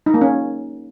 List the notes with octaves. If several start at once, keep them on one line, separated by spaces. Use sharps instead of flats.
D#4
A#3
C#4